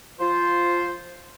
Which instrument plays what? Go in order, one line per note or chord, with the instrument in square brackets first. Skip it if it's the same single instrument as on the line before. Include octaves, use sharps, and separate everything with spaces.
[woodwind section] F3 F4 C5